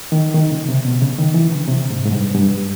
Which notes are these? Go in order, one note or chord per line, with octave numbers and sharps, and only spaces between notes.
D#3
D#3
C#3
C3
B2
C#3
D#3
E3
D3
C3
G#2
G#2
G2
G2